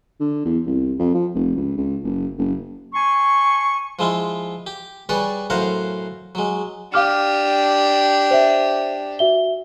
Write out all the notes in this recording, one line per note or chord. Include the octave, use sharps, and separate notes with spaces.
D3
E2
C2
F2
F3
F1
C#2
C#2
F#1
F#1
G#5 A5 C6 C#6
F3 G#3 E4 F4
G4
G3 G#4 B4 C#5 D5
F#2 A2 C5 F5 F#5 A#5
F#3 G#3
D4 G4 F5 D6 F6
C5 E5
F#4 E5 G7